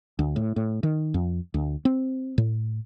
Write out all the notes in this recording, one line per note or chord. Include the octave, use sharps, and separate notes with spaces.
D2
A2
A2
D#3
F2
D2
C4
A2